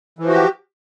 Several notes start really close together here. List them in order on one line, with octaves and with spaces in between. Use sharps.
E3 F3 F#4 G4